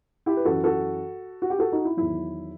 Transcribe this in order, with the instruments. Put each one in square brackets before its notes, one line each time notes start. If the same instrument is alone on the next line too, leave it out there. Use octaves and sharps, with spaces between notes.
[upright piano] E4 G4
B4
F#2 E3 F#4 A4
F#4 A4
F#4
G4
F#4 A4
D#4 F#4
E4
E2 D#3 F#3 E4